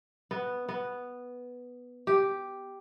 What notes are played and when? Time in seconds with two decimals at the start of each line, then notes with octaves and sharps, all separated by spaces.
0.31 B3
0.69 B3
2.07 G4